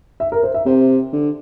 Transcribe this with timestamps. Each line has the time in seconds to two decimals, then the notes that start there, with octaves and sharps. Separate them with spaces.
0.20 E5
0.32 A#4
0.43 C5
0.54 E5
0.66 C3 C5
1.13 D3